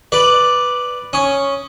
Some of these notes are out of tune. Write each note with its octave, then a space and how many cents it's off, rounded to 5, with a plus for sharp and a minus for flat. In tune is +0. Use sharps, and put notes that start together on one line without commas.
B4 +0 D5 +0
C#4 +0 D#6 +0